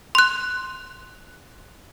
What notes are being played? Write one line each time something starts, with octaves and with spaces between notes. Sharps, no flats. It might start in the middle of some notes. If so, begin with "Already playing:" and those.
C6 F#6